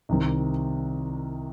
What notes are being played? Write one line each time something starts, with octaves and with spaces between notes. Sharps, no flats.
C2 C3 D#3